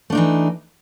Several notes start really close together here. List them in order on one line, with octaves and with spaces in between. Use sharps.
A3 D4 D#4 E3